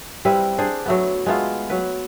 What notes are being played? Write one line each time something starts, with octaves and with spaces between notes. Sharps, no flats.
G3 C4 E4 B4
D4 G#4 C5
F#3 A3 B3
G#3 A3 B3 F4
F#3 B4